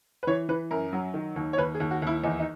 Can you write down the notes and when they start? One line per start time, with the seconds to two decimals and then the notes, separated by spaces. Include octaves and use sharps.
0.23 B4
0.27 E3 C#5
0.49 E3 B4
0.71 F#2 A#4
0.93 F#3
1.14 D#3
1.36 D#2
1.53 C#5
1.58 D#2 B4
1.75 G#4
1.80 D#2
1.91 F#4
2.02 D#2 E4
2.24 E2 D#4
2.40 D#4